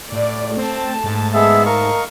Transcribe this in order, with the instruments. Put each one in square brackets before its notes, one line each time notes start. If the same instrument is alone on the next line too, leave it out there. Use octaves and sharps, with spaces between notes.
[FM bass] A2 [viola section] D5
[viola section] A3 A5 [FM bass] C4
[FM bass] G#2
[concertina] G#3 B3 G#4 [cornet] E5
[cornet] A#4 [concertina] D#5 F5 C#6